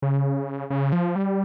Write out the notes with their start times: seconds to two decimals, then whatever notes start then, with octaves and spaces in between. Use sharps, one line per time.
0.02 C#3
0.70 C#3
0.92 F3
1.16 G3